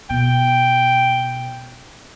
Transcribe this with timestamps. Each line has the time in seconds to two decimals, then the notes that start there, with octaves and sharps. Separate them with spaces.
0.10 B2 G5